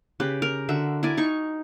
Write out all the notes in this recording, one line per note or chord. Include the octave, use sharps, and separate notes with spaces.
C#3 G4 B4
A#4
D3 F#4 E5
E4 A#4 D5 G#5
D#4 C#6